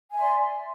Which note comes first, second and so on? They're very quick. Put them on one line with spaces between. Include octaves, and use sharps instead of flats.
G#5 E5 C6 D5